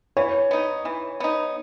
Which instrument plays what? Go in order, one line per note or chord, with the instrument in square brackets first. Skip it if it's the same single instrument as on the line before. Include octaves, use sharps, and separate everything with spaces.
[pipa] E3 [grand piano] C#5
[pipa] B3 D#4
E3
B3 D#4